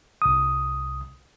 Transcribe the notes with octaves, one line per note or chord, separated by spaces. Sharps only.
C2 D#6